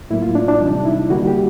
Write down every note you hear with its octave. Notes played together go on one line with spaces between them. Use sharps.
A2 F#3 A#3 E4
F4
D4
D4
C3 E3 G3 D#4
E4
D3 G3 A#3 F#4
G4